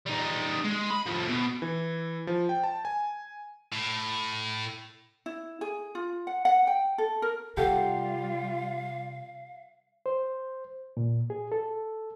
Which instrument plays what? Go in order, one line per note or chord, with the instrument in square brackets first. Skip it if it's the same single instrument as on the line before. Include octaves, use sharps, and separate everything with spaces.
[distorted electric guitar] G3 D#4
G#3
B5
A2 F3
B2
[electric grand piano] E3
F3
G5
A5
G#5
[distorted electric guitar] A2
[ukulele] E4
G#4
F4
F#5
F#5
G5
A4
A#4
[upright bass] C3 [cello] G3 F4 [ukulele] G4 A4 F#5 [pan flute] F5
[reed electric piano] C5
A#2
G#4
A4